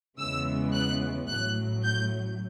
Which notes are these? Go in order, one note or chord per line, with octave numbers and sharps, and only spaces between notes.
E2 C#3 E3 G#3 B3 E6
F#6
A1 A2 F#3 F#6
G6